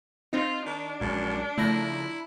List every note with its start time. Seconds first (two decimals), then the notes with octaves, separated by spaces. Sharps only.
0.33 C4 D#4 F4
0.66 D#3 D4
1.01 A#1 F#2 G#3
1.58 C#3 F3 A3 E4 A#6